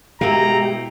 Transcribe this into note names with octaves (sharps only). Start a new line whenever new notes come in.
B2 G#3 E4 G4 A#4 F5 A#5